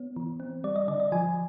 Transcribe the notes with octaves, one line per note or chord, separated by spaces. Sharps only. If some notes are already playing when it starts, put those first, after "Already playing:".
Already playing: B3 C#5
E3
C4
G3 D5
D#5
D3 D5
D#5
F3 G#5